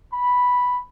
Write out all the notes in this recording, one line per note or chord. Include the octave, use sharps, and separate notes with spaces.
B5